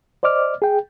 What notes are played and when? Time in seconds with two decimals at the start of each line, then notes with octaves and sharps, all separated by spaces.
0.23 C5 D5 D#5 D6 F6
0.62 G#4 G5